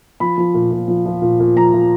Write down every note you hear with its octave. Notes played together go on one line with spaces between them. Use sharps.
F3 B5
F3
A#2
A#2
F3
F3
A#2
A#2
F3 A#5
F3